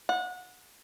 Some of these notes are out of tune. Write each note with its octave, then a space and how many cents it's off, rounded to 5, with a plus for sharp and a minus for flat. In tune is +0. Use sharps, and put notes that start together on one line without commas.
F#5 -25